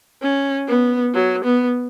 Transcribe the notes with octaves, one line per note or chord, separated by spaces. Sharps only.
C#4
B3
F#3
B3